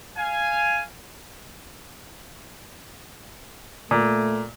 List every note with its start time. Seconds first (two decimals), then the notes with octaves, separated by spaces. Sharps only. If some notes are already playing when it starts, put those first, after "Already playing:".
0.17 F5 G#5
3.91 A#2 A3